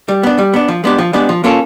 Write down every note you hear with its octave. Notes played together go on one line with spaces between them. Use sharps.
G3
B3 D4
G3
B3 D4
F3
G#3 B3 D4 G4
F3
G#3 B3 D4 G4
F3
A#3 C#4 F4 A4